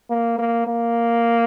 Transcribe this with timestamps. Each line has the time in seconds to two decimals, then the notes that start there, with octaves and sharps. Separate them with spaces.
0.10 A#3
0.39 A#3
0.67 A#3